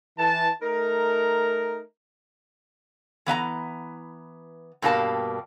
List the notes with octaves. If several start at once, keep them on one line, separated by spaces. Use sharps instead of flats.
E3 A5
A3 D#4 A#4
E3 B3 E5 A#5
G2 B2 G3 A#3 A5